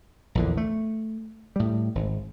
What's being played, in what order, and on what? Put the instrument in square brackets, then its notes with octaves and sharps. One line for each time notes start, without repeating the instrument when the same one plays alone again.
[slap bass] A#1 E2 D3
A3
A2 G3
G#1